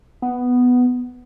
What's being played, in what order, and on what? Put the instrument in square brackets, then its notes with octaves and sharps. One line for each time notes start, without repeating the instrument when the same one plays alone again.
[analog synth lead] B3